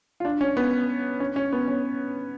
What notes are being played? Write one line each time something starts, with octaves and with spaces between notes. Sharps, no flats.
F4
D4
C#4
B3
C#4
C#4
B3
C#4